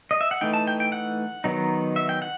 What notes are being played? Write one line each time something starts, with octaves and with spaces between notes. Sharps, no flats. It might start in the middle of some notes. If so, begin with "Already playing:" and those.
D#5
E5
F#5
E3 A3 D#4 G5
A5
G5
G5
F#5
D#3 F#3 B3 D#4
E5
G5
F#5